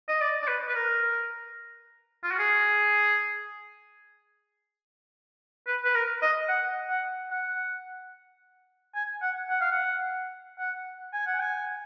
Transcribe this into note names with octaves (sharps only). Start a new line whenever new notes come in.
D#5
D5
D5
B4
B4
A#4
F4
F#4
G#4
B4
B4
A#4
D#5
F#5
F#5
F#5
G#5
F#5
F#5
F5
F#5
F#5
G#5
F#5
G#5